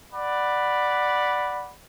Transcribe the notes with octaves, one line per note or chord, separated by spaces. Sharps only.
D5 F#5 B5